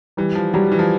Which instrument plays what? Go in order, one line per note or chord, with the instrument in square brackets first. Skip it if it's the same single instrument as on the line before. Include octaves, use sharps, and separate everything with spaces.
[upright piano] E3 [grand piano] G3
[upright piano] F3
[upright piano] F#3 [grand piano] G3
[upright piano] E3
F3